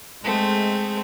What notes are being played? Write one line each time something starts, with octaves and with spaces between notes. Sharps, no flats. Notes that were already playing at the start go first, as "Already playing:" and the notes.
G#3 A3 C4